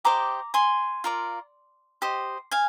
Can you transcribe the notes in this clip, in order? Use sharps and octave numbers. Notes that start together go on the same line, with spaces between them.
G4 C5 D#5 A#5 D6
G#5 C6
F4 A#4 D5
G4 C5 D#5
F5 G#5